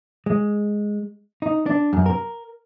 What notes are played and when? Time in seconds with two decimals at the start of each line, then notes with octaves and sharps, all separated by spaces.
0.26 G#3
1.42 D#4
1.66 D4
1.93 F#2
2.06 A#4